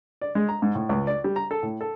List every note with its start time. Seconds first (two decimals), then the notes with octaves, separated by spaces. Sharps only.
0.21 D5
0.35 G#3
0.49 A#5
0.62 G#2
0.75 A2
0.89 C#2
1.07 D5
1.24 G3
1.36 A#5
1.51 A4
1.63 A2
1.81 A4